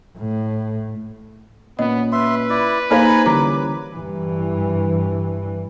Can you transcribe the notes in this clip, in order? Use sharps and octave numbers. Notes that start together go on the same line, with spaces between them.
A2
A#2 B3 C#4 D#5
B4 E5 C6
E4 D5
A#3 D#4 G#4 C5 F5 G#5 A#5 B5
D3 E3 G3 C#4 A#5 D6
G2 E3